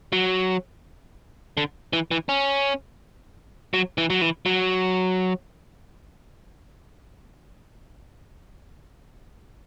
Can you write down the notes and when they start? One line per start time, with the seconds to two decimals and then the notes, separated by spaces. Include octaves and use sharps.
0.13 F#3
1.57 D3
1.93 E3
2.11 E3
2.29 C#4
3.74 F#3
3.98 E3
4.10 F#3
4.22 E3
4.46 F#3